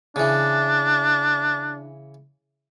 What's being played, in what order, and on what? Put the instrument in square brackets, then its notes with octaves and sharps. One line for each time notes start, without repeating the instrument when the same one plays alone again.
[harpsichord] C#3 E3 [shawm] D4